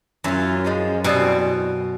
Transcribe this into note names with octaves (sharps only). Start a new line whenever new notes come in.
F#2 E3 A3 C#4 F4
F3 G#3 C#4
B2 E3 G3 C4